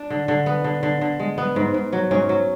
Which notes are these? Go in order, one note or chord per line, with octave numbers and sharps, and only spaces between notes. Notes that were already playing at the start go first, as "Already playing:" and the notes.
Already playing: D4
D3
D3
B3
D3
D3
D3
G#3
B3
G#2
G#2
F#3
G#2 C#4
F#3